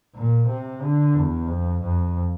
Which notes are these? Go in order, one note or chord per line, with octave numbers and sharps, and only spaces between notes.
A#2
C3
D3
E2
F2
F2